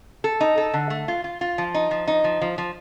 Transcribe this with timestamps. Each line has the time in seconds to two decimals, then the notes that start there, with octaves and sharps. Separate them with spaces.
0.24 A4
0.41 D#4
0.58 A4
0.74 D3
0.90 A3
1.08 F4
1.24 F4
1.41 F4
1.58 F3
1.74 D#4
1.91 F3
2.08 D#4
2.24 F3
2.42 F3
2.58 F3